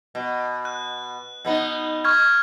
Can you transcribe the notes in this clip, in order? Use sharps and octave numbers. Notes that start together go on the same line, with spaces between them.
B2
F#6
B2 B3 D#4
C#6 F6 G#6